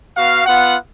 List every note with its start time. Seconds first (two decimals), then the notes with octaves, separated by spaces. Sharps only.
0.16 B3 F#4 F5
0.46 B3 F4 F#5